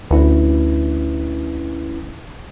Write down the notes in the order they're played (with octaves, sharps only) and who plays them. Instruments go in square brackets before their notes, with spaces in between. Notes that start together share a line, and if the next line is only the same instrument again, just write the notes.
[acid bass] D2 [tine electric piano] C#4 E4 B4